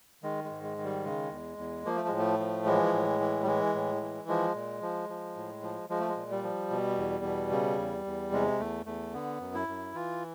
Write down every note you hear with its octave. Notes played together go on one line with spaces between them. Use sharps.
D#3 G#3
G#3
G#2
G#3
D#3
G3
C#3 G#3
E2
E2
F3 A#3
A3
A2 G#3
A3
F3
E3 G#3
A2
E3
G3
E3 G#3
A2
E3
F3 G#3
A#2
F3
F3
A2
F3
F3 G#3
A3
G#3
A#2
G3
F3
B2
E2
B2
C#3
E2
E2
C3 G#3
E2 A3
E2 A3
D3 B3
F#2
E4
F#2
E3 F4